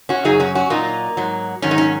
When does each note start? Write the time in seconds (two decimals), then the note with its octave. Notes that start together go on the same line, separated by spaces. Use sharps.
0.09 C#4 F#4
0.24 F#2 C#3 F#3 D#4 G#4
0.40 C#4 F#4
0.55 C#4 F#4
0.70 A#2 F#3 A#3 D#4
1.17 G#2 F#3
1.62 G#2 D#3 F#3 C#4
1.71 D#4
1.78 C#4